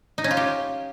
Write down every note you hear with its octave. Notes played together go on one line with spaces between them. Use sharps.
D#4
C#4
F4
G4